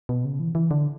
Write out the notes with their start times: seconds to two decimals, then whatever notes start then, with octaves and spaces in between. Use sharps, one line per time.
0.09 B2
0.25 C#3
0.40 E3
0.55 E3
0.71 D3